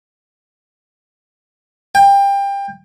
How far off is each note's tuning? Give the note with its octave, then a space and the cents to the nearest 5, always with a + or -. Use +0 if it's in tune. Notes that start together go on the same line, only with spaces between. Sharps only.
G5 +25